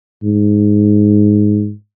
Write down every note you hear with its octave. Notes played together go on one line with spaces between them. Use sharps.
G#2